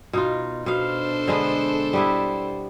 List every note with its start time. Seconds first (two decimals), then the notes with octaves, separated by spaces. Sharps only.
0.13 B2 D#4 F4
0.66 B2 D4 A4 C5 F5
1.28 D3 G#3 B3
1.93 G3 B3 E4